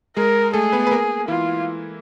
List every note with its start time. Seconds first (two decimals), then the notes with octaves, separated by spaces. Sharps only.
0.16 G#3 G#4 A#4
0.54 A3 G#4 A4
0.73 B3 B4
0.87 B4
0.91 A#3 A#4
1.28 E3 E4 F4